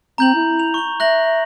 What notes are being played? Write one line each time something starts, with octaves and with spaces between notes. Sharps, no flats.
C4 A#5 G6 F#7
E4
F7
C#6 G7
E5 F#6 A#6 F#7